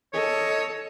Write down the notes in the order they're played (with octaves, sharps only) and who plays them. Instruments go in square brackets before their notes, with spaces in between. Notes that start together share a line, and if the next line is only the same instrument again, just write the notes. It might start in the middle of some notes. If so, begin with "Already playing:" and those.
[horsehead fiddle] A4 [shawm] C#5 [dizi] D#5